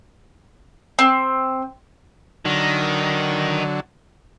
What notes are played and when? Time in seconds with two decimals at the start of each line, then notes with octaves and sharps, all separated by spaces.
0.99 C4
2.45 D3 D#3 F#3